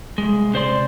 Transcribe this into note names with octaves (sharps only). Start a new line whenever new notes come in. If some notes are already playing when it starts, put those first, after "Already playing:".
C2 G#3
C3 C5 D5 C6